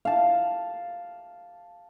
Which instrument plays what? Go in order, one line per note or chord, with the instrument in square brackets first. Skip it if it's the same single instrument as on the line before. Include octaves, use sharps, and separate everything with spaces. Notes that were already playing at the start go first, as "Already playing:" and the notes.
[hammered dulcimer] F5 A5